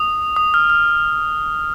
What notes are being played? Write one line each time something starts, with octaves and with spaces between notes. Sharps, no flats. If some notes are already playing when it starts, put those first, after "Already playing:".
Already playing: D#6
D#6
F6
F6